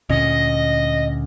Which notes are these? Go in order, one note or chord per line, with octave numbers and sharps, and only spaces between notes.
D2 A#2 C#4 D#5